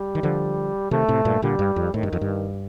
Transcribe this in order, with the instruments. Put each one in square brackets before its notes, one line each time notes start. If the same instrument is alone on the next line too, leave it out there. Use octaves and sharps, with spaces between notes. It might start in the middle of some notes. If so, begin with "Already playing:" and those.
Already playing: [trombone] G3
[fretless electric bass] D#3
D3 F3
[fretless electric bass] C3 D#3 [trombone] A3
[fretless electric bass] A2 C3
G2 A#2
[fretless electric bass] A#2 D3 [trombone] G3
[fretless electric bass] G2
F2
[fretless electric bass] A2 [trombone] D#3
[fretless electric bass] G2
F2
G2